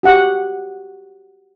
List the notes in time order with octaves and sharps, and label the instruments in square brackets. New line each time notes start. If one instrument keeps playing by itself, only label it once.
[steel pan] F#4 G4 F#5